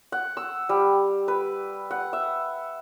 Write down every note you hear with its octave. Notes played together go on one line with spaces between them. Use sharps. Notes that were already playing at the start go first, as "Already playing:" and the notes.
F#5
E6
G3
B4
F#5
E5